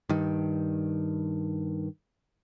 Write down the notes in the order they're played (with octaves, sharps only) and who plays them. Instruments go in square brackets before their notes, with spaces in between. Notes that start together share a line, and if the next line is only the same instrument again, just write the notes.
[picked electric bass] G2 D#3